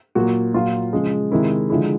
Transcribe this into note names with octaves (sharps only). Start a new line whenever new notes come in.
A#2 F#3 F#4
A#2 F#3 F4
C#3 F3 G#3
C3 D#3 G#3 E4
D3 F3 G#3 E4